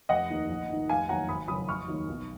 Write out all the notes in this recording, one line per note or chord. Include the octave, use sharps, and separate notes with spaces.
F1 D#5 F#5
D#2 D#3
A#1
G#2 D#3
F1 F5 G#5
D#2 D#3 F#3 F#5 A#5
G#1 B5 D#6
F#2 C#3 F#3 B5 D#6
F1 C#6 F6
D#2 D#3 F#3
B1